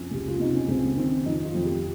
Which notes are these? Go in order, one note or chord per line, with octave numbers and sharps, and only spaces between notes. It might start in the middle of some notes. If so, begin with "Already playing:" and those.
Already playing: F2 C#4
C#2 G4
F4
C3 D#4
C#4
C#2 C4
D#3 C4
F2 D#4
F4
F2
G4